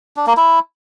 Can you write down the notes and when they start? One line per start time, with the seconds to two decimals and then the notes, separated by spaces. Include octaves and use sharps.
0.17 D4
0.27 A#3
0.37 E4